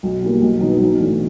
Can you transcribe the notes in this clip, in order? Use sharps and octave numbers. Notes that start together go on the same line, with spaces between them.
B1
B2 G3 A#3
B1
B2 F#3 B3 D#4
B1
A2 E3 A3 D4